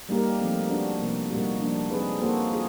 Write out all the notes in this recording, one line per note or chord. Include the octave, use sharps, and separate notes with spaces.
G3 A#3 D#4 G4 A#4
F3 A3 C4 D#4
B3 D4 F#4
C3 F3 A#3
A#2 G3 A#3 D#4 F#4
F3 A#3 D4
G#3 C4 D#4 G#4 B4
A#3 D#4 F#4 A4 C5
F4 G#4